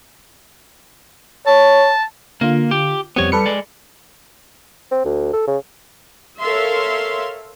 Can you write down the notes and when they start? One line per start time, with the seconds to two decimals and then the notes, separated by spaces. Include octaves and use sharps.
1.47 C#5 A5
2.41 D3 A#3 F4
2.71 G4
3.16 F2 G3 B3 C4 C#5
3.32 G3 A4 B4 C#7
3.46 G#3 D5
4.91 C4
5.05 D2
5.33 A4
5.48 C#3
6.40 A4 A#4 C#5 E5 F5 C6